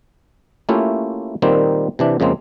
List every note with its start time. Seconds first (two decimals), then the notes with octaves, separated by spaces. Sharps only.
0.69 A3 A#3 C#4 E4 F4 G4
1.42 A#2 D#3 G3 A#3 C4 G4
1.99 C3 E3 D4
2.20 F2 C#3 G#3 A#3 C4